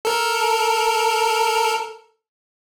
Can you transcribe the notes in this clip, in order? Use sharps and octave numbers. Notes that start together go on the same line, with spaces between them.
A4 A#4